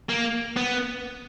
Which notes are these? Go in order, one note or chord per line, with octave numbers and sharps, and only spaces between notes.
A#3
B3